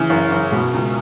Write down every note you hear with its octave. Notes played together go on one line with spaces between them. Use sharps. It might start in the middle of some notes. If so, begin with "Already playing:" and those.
Already playing: C#3 E3
F#1
F#1
B2
C#2